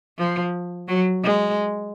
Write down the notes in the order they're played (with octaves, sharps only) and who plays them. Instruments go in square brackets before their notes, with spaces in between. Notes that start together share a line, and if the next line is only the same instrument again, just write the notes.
[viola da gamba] F3
F#3
G#3